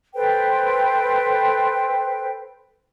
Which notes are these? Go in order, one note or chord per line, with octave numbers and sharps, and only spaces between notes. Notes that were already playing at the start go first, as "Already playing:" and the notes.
A4 B4 C5 G5